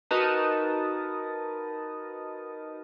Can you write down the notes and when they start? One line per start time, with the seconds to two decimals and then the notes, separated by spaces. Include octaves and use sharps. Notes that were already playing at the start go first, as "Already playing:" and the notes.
0.11 D#4 F#4 A#4 B4 A5 D#6